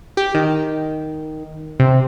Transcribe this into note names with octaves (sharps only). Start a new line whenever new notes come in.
G4
D#3
C3